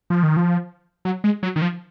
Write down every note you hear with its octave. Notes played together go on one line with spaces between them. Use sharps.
F3
D#3
F3
F#3
G#3
F#3
D#3
F3